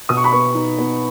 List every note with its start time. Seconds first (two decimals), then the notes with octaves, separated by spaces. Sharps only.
0.09 B2 D#6
0.17 C#6
0.24 B5
0.32 B3 C#6
0.55 D#4
0.78 B3